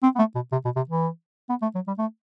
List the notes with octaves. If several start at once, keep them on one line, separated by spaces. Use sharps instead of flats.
C4
B3
A3
B2
C3
B2
C3
E3
B3
A3
F#3
G3
A3